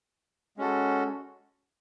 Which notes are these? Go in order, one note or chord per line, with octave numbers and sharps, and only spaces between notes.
G#3 C#4 F#4 A4